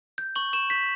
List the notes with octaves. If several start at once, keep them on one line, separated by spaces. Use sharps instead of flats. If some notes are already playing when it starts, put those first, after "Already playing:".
G6
C#6 F#7
C#6 E7
G6 B6